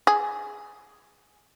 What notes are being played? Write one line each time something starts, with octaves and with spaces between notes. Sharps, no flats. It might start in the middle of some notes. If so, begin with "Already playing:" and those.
G#4